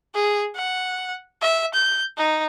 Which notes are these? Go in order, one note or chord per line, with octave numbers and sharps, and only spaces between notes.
G#4
F#5
E5
G6
D#4